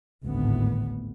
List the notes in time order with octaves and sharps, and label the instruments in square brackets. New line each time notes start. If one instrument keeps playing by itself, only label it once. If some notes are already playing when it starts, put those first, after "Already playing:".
[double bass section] G#1 D2 A2 B3